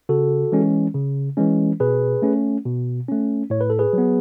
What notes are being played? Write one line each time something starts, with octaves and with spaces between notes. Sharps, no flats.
C#3 F#4 A4
E3 G#3 C#4
C#3
E3 G#3 C#4
B2 G#4 B4
A3 C#4
B2
A3 C#4
A2 C#5
B4
A4
G#4 B4
F#3 B3